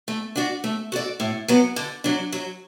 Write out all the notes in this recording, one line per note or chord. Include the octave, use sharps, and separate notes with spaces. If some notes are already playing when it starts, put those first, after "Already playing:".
A3
D4 F#4 D5
A3
F#4 A4 D5
A2
F#3 B3
D3
F#3 D4
F#3